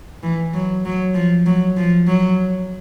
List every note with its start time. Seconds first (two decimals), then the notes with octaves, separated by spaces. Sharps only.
0.23 E3
0.54 F#3
0.85 F#3
1.15 F3
1.46 F#3
1.77 F3
2.07 F#3